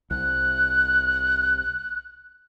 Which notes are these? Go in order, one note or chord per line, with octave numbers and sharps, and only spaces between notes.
C2 F#6